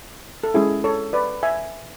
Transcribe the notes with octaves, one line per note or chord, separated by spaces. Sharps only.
A4
G#3 C#4 E4 G#4
A4 C#5
B4 D5
E5 G#5